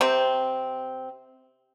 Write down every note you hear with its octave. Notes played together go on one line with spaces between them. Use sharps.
C3 C4